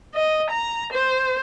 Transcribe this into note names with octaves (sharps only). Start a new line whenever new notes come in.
D#5
A#5
C5